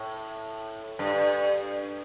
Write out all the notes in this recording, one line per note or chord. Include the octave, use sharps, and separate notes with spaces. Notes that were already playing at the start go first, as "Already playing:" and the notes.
Already playing: A2
G2